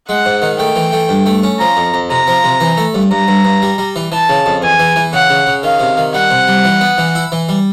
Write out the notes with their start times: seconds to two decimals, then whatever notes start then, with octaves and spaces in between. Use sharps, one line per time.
0.09 G#3 F#5
0.25 G#2
0.42 D#3
0.59 A3 G5
0.76 E3
0.93 A3
1.09 G2
1.26 A3
1.43 C#4
1.60 F3 A#5
1.77 F2
1.94 F2
2.10 C3 A#5
2.27 F3
2.44 C3
2.61 E3
2.77 A3
2.94 G2
3.11 G2 A#5
3.28 G2
3.45 G2
3.62 G3
3.78 G3
3.96 E3
4.12 E3 A5
4.29 C#3
4.46 F2
4.62 E2 G#5
4.80 E3
4.96 E3
5.13 C#3 F#5
5.30 C#3
5.47 C#3
5.63 D#3 F5
5.80 C3
5.97 D#3
6.14 G3 F#5
6.31 C3
6.47 G3
6.65 E3
6.81 B3
6.98 E3
7.15 E4
7.32 E3
7.49 G3